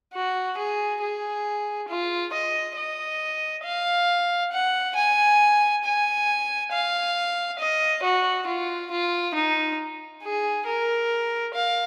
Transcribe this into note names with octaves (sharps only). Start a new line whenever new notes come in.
F#4
G#4
G#4
F4
D#5
D#5
F5
F#5
G#5
G#5
F5
D#5
F#4
F4
F4
D#4
G#4
A#4
F5